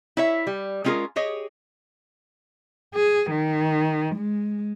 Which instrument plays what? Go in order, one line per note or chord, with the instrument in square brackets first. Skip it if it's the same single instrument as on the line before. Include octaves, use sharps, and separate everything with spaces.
[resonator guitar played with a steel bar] E4 C#5 E5
G3
G#3 C#4 F4 G4 G#4 A#4
G4 G#4 C#5 D#5
[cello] G#4
D#3
G#3